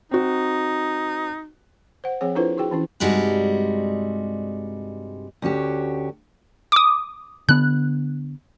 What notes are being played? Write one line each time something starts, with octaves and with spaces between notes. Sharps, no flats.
C4 D#4 F#4
C5 F#5
F3 C4 G#4 C#5 F#5
D4 E4 F4 A4 B4 C5
E4 F#4 G#4 G5
E3 C#4 E4
G2 C3 G3 G#3 D#4 F#4
D2 C#4 F#4 G4
D6 D#6
D3 B3 F#6